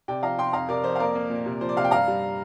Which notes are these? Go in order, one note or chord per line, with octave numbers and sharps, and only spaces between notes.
C3 D5 G5
F3 F5 A#5
C3 G5 C6
F2 F5 A#5
C3 A#4 D5
F2 C5
F5
A#3 A#4 D5
A#3
A#2
C3
F3 C5
D5
C3 F5
G5
G2 F5 A#5
G3